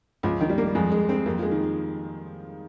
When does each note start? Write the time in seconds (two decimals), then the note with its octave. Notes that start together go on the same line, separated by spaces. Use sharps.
0.23 C#2 F3
0.41 D#3
0.49 G3
0.58 A#3
0.75 F2 G#3
0.92 G#3
1.09 C4
1.26 F2 A#3
1.39 F3
1.43 G#3
1.51 D#3